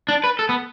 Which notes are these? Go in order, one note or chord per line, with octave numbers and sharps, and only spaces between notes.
D4
B4
A4
B3